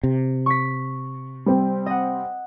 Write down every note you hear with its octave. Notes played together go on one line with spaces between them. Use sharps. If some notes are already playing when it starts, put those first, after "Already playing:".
C3
C#6 B6
G3 C4
D#5 F#5